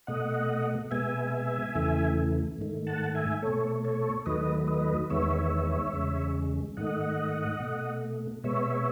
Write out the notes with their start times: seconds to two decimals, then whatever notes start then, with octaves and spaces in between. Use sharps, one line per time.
0.07 B2 A3 D#5 F#5
0.91 B2 G#3 B3 E5 G#5
1.75 E2 C#3 E3 A3
2.58 G#2 D#3 A3
2.87 F#5 A5
3.15 E5 G#5
3.42 B2 A3 A4 C#5
3.84 A4 C#5
4.26 D#2 D#3 F#3 A3 B4 D#5
4.67 B4 D#5
5.10 E2 D#3 G#3 B3 C#5 E5
5.93 E2 C#3 G#3
6.77 G#2 D#3 A3 D#5 F#5
7.60 B2 A3
8.44 B2 G#3 B3 C#5 E5